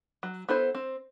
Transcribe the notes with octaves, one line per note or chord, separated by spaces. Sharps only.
F#3
B3 E4 A4 C5
C4